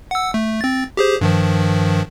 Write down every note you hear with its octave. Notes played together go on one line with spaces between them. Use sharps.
F#5 E6
A3
C4 A6
G4 G#4 C5
G2 D#3 F3